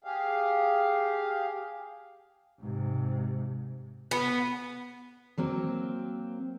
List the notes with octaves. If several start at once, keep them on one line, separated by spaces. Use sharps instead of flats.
G4 G#4 F5
G#2 C3
B3
F#3 A#3 C4